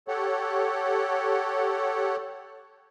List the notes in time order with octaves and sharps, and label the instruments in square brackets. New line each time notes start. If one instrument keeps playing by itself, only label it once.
[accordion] G4 A4 C#5 F#5